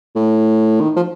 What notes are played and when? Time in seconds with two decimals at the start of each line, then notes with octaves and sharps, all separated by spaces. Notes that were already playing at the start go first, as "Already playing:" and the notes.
0.16 A2
0.80 D#3
0.96 F3